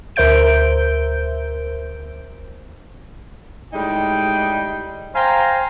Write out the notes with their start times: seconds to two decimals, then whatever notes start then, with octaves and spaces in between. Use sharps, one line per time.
0.16 D2 A#4 C5 E5 G6 D7
3.74 A2 G3 G#3 D#4 G5
5.16 C5 F5 G5 G#5 A#5